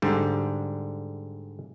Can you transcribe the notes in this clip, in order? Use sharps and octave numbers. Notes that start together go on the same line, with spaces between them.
G#2 D3 G3